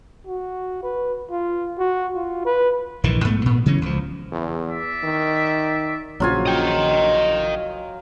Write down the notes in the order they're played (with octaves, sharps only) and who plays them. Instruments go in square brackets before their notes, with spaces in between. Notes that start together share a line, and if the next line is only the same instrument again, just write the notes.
[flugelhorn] F#4
B4
F4
F#4
F4
B4
[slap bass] A#1 G#2 D#3 E3
G#2 A3 B3
A#2 B3
C#3 E3 F#3 C#4
C#2 F3
[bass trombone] E2
[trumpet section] D5 E5
[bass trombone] D#3
[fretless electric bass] A#1 C#3 F3 [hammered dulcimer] F#3 F4 G#5
[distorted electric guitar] D#5 G5